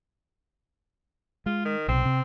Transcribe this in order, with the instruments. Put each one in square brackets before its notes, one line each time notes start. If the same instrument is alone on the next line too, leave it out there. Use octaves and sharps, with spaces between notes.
[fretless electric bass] G#3 [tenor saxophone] F4
[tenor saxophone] D#3
[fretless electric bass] B1 C3 [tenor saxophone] C4
[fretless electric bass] C3